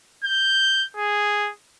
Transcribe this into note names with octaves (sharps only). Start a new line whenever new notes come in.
G6
G#4